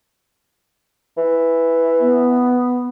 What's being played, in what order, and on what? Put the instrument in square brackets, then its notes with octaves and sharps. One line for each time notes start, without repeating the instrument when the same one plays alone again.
[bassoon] E3
[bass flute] B3